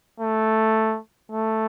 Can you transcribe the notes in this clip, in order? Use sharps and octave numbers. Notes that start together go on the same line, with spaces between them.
A3
A3